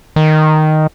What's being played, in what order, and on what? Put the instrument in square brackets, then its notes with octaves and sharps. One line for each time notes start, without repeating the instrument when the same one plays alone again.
[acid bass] D#3